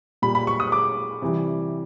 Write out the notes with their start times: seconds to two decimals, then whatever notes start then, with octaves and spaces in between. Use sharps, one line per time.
0.22 A#2 G3 B5
0.35 B5
0.47 C#6
0.60 D#6
0.72 D6
1.22 C3 E3 G3